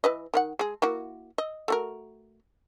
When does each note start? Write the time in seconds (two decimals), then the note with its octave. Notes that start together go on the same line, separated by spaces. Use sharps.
0.04 E3 B4 D#5
0.34 D#3 F4 F#5
0.59 G#3 G#4
0.82 A#3 E4 F#4
1.38 D#5
1.68 A3 F#4 A#4